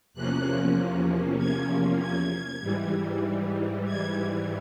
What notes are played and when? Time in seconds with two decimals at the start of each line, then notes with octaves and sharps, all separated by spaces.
0.14 E2 C3 F3 A#3 C#4 F#6
1.38 G#6
2.00 G#6
2.61 G#2 E3 G3
3.85 G#6